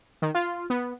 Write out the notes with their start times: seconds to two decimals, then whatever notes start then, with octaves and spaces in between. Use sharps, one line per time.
0.22 D#3
0.35 F4
0.70 B3